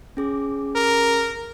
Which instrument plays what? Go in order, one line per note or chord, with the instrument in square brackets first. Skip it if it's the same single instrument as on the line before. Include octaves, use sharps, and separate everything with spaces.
[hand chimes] C#4 G#4 D6
[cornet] A#4